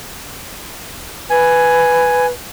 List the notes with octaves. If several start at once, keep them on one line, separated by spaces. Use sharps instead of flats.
B4 G#5